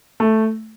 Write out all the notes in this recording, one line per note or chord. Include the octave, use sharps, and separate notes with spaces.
A3